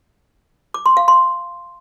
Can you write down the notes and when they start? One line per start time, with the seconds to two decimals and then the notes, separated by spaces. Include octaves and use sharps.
0.74 D6
0.86 C6
0.97 F5
1.08 C6